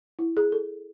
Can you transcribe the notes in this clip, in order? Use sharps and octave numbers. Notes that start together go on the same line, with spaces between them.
E4
G#4
A4